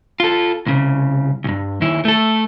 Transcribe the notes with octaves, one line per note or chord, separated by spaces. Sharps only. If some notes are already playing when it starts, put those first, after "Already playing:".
F4 A4
C2 C#3
B1 G2
D#2 E4
A3 A4